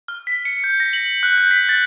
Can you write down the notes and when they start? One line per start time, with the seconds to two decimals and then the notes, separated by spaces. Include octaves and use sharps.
0.08 F6
0.27 B6
0.45 C#7
0.64 G6
0.80 A#6
0.93 F#7
1.23 F#6
1.38 G6
1.51 B6
1.69 A6